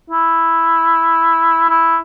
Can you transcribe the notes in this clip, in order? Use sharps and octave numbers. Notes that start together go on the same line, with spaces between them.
E4
E4